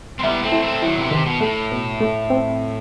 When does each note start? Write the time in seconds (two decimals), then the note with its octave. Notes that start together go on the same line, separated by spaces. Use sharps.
0.19 C4
0.23 G3 B3 E4
0.43 A3 C4
0.52 E4
0.63 A3 C4
0.82 D#3 F#3 E4
0.97 C3 E3
1.11 C3 D#3
1.26 B2
1.41 A2 A3
1.71 B2
2.00 A3
2.30 C4